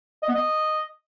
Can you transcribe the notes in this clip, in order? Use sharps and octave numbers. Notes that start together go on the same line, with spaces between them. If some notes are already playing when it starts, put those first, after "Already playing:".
D#5
B3
D#5